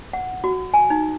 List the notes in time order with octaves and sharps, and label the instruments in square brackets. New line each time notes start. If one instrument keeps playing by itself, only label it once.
[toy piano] F#5
F#4
G#5
D#4